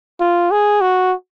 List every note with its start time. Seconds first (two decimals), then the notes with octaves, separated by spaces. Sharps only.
0.20 F4
0.51 G#4
0.81 F#4